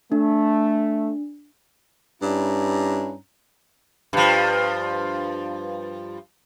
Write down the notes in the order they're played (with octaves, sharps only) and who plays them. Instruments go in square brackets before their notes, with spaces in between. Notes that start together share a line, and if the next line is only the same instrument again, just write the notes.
[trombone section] A3 [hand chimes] D4
[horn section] G2 C#4 D4 E4 A#5
[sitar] G2 F3